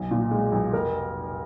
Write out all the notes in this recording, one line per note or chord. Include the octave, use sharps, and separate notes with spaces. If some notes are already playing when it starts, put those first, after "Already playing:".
Already playing: B1
A#2
G#3
B1
F1 A#4